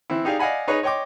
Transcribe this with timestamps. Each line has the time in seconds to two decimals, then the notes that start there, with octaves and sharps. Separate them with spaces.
0.10 E3 C4 E4
0.25 D#4 G4 G#4 D5 F5
0.39 D5 D#5 F5 F#5 G#5 B5
0.68 D#4 G#4 B4 C#5 D#5
0.83 C#5 D#5 G5 C6 D6